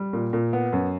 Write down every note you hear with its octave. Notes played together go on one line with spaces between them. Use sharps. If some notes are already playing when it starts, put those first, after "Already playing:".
Already playing: G3
A#2
A#2
B3
F#2